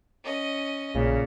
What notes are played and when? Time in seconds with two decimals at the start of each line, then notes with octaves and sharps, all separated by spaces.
0.24 C#4 D#5
0.94 A#1 A#2 C#3